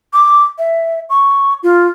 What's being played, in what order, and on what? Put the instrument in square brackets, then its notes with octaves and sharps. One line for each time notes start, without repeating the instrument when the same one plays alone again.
[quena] D6
E5
C#6
F4